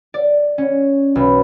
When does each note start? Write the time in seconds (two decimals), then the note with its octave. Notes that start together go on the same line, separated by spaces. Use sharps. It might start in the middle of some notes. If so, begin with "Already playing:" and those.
0.14 D5
0.58 C#4
1.15 B1